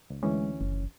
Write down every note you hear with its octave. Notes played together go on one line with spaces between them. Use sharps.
C#2
D2 E3 G#3 C#4
F#1